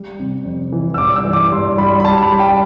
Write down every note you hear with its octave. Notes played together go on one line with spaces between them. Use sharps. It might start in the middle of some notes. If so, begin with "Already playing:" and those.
Already playing: G3
C3
F2
E3
E6
G2 D6
E6
E3
D6
G2 C6
G3 B5
B5
G3 A5
B5
G3
G5